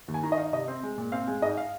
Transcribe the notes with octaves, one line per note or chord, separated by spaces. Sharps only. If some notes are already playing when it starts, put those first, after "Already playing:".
D#2
G#5
D#3 A#5
D#5
D#4 F5
C3 D#5
C4
G#3
A#2
C4 F5
G#3
G#2 D#5
F5